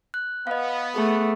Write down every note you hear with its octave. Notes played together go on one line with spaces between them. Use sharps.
F#6
B3 D#5 F5
A3 G#4